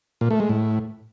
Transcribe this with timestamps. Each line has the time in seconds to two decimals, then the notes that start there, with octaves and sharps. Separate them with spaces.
0.21 A#2
0.31 A3
0.40 G#3
0.49 A2